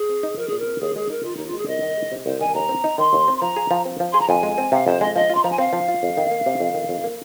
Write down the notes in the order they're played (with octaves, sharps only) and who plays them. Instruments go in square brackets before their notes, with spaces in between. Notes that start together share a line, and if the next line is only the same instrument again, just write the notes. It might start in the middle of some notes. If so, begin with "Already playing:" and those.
Already playing: [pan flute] G#4
[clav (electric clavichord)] C4
D#4
[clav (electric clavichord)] F3 [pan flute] A#4
[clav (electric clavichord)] A#2 [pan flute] G#4
[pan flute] A#4
[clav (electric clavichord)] C4
[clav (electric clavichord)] D#2 [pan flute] G#4
[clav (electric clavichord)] G#3 [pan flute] G#4
[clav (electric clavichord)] D#4 [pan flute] A#4
[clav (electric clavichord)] D#3 [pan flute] F4
[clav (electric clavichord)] D#2 [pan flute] D#4
[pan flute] F4
[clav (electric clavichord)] G#3 [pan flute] G#4
[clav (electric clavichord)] C2 [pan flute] D#5
[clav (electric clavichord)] D#3
G#3
C3
[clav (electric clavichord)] C2 [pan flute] C5
[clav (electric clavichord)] D#3 [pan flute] G#5
[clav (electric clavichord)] D#2 [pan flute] A#5
[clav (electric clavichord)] C4
D#4
[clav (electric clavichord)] D#3 [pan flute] C6
[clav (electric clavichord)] D#2
C4
[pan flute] C6
[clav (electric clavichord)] F3 [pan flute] A#5
[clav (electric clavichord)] G#4
F3
C4
F3
[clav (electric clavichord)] G#4 [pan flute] C6
[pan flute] A#5
[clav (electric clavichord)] F2 [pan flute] G#5
[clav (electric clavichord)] G#3
C4
[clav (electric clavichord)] C3 [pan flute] F5
[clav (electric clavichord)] F2 [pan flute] C5
[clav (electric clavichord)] G#3 [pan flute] D#5
[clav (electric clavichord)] F3 [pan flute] D#5
[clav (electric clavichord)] F4 [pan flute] C6
[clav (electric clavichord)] F3 [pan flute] A#5
[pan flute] G#5
[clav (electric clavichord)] C4 [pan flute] F5
[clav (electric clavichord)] F3
F4
F2
D#3
A#3
C3
F2
D#3
F2
A#3